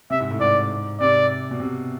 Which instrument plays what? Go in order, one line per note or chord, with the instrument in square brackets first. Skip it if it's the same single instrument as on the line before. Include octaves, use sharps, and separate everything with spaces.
[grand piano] C3 [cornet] E5
[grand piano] G#2
A2
[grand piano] G#2 [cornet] D5
[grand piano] C3 [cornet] D5
[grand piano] B2
C3